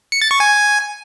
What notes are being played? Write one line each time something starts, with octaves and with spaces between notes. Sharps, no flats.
C#7
A6
C#6
G#5